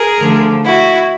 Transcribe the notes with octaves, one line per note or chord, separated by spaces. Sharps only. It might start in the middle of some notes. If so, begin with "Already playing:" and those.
Already playing: G#4 A#4
D3 F3 A3
E4 F#4